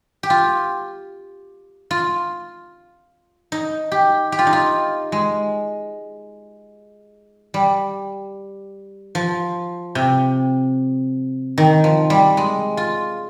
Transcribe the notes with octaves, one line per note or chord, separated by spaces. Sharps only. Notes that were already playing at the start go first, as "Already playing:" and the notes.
G4
F4
F4
D#4
G4
G4
F4
D#4
F4
G#3
G3
F3
C3
D#3
F3
G3
G#3
F4